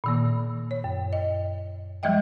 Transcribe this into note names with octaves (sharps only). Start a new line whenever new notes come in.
A#2 D#3 A#3
C#5
F#2
D#5
F3 G3 G#3 D#5 E5 G5